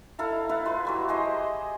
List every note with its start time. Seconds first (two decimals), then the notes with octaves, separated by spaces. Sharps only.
0.19 E4 A4 F5 A#5
0.49 E4 B4 F5 F#5
0.65 F4 B4 C6
0.85 E3 F#3 G3
1.08 G4 G#4 C5 D#5